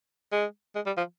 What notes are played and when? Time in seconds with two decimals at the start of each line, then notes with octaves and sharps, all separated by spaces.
0.32 G#3
0.75 G#3
0.86 G3
0.97 F3